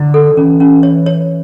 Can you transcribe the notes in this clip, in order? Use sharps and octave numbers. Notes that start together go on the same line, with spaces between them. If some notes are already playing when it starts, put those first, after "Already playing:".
Already playing: D3 E4
A4
E3 C#4
C#4
C#5
C#5